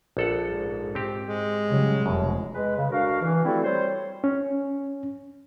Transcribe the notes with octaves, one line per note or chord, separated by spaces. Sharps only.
A#1 A4 F#5
G#2
C4 G4
G#3
C#3 F#3 G3
F1 F#2 B2
G#3 B4
C#3
D2 D4 F#4 A#4 F5
E3
G3 A3 C4 E4 F#4 A4
G3 C5 C#5
C#4